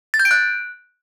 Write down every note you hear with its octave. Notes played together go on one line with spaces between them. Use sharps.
A6
G6
D7
F#6